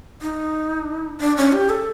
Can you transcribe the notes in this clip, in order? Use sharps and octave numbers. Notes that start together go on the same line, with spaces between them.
D#4
D4
C#4
G4
A4